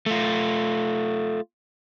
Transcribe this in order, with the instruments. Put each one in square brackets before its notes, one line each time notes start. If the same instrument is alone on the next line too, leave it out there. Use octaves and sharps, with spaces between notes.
[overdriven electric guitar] A3 F4